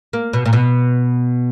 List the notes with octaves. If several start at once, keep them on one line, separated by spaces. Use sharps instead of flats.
A#3
B2
A#2
B2